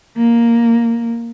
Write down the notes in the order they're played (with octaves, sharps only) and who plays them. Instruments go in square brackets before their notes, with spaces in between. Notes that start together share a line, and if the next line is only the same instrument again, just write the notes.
[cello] A#3